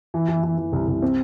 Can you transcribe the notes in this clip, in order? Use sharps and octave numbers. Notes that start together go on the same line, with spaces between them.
E3
E3
E3
E3
C2
C2
C4